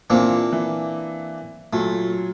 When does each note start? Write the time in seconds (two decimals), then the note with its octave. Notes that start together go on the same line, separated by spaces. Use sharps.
0.10 A#2 E3 A#3 C4 D4
0.53 E3
1.73 A#2 F#3 A3